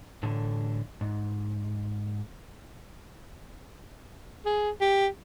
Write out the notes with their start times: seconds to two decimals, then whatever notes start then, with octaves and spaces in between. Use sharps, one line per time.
0.23 A2 D3 E3
1.01 G#2
4.45 G#4
4.81 G4